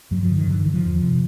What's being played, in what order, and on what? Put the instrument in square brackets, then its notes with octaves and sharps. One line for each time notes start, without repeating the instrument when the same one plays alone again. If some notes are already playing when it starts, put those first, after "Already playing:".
[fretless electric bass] G2 F#3
F3
D3
D#3
G2 D3
D#3
D3 E3
F3
E2
C3